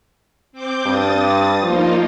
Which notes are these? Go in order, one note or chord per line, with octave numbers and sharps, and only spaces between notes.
C4 D6 G6
G2 D#6 A6
F3 A#3 D#4 F4